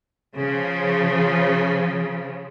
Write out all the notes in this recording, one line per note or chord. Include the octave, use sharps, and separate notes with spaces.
C#3 F3